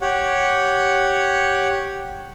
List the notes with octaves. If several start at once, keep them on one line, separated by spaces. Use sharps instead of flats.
G4 C#5 F#5